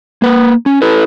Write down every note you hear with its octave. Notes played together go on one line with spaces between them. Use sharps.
A#3 B4
C#4
E4 A4 B4